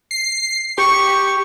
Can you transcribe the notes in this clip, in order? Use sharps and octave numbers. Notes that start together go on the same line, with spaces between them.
C7
G4 C#6